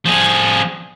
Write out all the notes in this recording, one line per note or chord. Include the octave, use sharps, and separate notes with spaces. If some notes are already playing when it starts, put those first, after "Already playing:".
F3 G#4